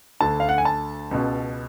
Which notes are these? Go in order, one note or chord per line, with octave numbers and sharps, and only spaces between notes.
D2 D3 A5
F5
F#5
G#5
A5
C#2 B2